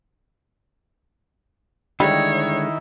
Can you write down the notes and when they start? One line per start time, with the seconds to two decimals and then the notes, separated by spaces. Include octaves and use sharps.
2.00 D3 D#3 G3 G#3 E4 C#5